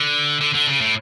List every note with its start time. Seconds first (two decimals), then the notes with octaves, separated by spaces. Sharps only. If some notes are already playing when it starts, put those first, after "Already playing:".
Already playing: D3
0.41 D3
0.54 D3
0.67 C#3
0.81 A2